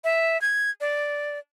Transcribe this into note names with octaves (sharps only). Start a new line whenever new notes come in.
E5
G#6
D5